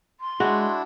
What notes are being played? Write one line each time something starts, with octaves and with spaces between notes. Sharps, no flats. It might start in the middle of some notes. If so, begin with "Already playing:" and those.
C6
G#3 D4 E4 F#4